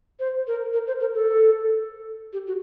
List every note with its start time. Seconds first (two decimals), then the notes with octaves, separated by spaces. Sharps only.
0.20 C5
0.47 A#4
0.73 A#4
0.87 C5
1.00 A#4
1.14 A4
2.33 G4
2.47 F#4